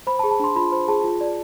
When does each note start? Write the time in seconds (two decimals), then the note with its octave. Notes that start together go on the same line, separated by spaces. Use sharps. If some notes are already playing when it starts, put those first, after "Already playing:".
0.07 C5 B5
0.19 A5
0.24 G#4
0.31 A5
0.40 D4 C6
0.56 F4 B5
0.72 C5
0.88 G#4 A5
1.04 F4
1.21 D5